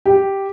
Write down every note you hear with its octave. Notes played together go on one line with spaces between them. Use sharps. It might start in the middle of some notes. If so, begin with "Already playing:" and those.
G4